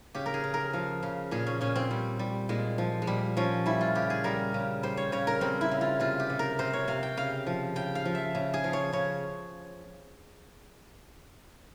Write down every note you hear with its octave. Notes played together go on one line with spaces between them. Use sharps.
C#3 G4
A#4
G#4
C#3
A#4
F3
C#3
A#2 G#4
C#4
A#2 C#4
C4
G3
G3
A#2 G#3
F3
G#3
A#2 G3
F3 C#4
G3 E4
F4
C#3 G4
G#4
G3 A#4
C#3
G3 C5
C#5
C#3 C#5
A#4
G3 C4
E4
C#3
F4
C3 F4
G4
C3
A#4
C3 C5
C#5
C3 F5
G5
C#3 F5
F3
C#3 G5
F5
F3
E5
C#3
G#4
F3
C#5
C#3 C#5